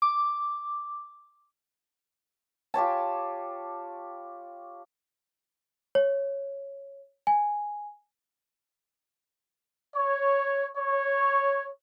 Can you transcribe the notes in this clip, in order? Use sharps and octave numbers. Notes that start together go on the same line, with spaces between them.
D6
F4 G4 C#5 A5
C#5
G#5
C#5
C#5